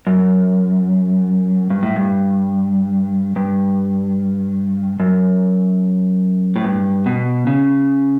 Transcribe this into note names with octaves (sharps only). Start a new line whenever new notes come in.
F#2
G2
A2
G2
G2
F#2
A2
G2
B2
C#3